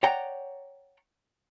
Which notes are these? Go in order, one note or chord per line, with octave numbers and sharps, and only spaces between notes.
C#5 D5 F#5 G5 A#5